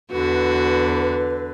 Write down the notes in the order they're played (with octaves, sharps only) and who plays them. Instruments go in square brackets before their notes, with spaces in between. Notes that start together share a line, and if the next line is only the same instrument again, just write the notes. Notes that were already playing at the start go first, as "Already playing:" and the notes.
[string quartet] E2 D3 [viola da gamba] F#4 [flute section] B4